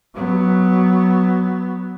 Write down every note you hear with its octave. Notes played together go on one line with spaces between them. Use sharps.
F#3 B3